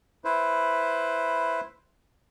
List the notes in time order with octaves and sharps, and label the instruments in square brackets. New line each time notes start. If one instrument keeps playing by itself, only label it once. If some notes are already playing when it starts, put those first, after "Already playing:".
[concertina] E4 B4 C5